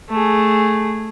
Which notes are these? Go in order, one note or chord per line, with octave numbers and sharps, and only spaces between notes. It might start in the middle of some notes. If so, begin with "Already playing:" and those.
A3 G#4